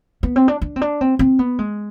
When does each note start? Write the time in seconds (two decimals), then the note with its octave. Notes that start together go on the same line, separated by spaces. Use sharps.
0.23 B3
0.36 C4
0.48 D4
0.62 D4
0.76 C4
0.81 D4
1.01 C4
1.19 C4
1.39 B3
1.59 G#3